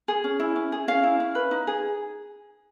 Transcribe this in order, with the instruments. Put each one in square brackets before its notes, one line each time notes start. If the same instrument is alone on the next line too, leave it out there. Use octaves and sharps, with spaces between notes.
[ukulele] G#4
C#4
E4
C#4
G#4
C#4 F5
E4
C#4
B4
D#4
G#4